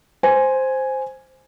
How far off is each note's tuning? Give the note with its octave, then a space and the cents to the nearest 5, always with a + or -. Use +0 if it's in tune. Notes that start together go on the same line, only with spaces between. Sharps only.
C5 +0 G#5 +0